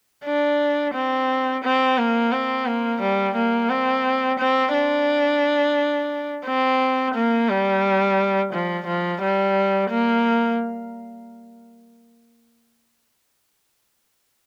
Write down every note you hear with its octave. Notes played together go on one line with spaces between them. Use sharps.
D4
C4
C4
A#3
C4
A#3
G3
A#3
C4
C4
D4
C4
A#3
G3
F3
F3
G3
A#3